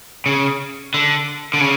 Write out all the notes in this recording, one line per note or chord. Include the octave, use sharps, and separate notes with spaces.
C#3
D3
D3
C#3